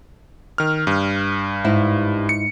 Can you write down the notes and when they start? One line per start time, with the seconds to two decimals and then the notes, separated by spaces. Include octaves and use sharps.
0.58 D#3 F6
0.87 G2
1.65 G#2 E4
2.29 C#7